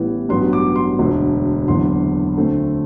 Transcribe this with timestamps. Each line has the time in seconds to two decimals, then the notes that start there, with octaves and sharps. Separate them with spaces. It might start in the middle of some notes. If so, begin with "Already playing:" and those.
Already playing: A1 A2 E3 G3 B3
0.29 A1 G2 F#3 B3 C6
0.53 D6
0.76 C6
0.99 E1 D2 D3
1.67 F#1 E2 D3 C6
2.37 D2 D3 A3 C4